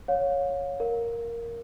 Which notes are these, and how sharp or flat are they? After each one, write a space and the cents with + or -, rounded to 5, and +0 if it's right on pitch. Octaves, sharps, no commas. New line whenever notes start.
C#5 +0 F5 +35
A#4 +0 F5 -25